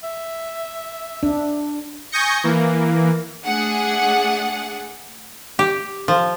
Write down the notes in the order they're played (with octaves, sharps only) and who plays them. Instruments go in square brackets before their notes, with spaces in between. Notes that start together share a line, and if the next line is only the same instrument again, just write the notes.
[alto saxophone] E5
[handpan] D4
[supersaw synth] G#5 C#6 D#6 G6 A#6 C#7
E3 A#3
[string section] A3 D4 G#4 F#5
[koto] G4
F3